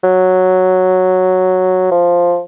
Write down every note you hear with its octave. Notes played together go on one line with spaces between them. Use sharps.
F#3
F3